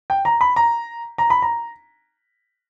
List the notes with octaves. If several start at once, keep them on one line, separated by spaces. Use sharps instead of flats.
G5
A#5
B5
A#5
A#5
B5
A#5